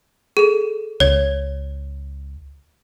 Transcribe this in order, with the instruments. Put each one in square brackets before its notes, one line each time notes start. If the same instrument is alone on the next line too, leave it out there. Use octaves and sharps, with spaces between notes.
[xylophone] G#4 A4
[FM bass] C#2 [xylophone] C#5 G#6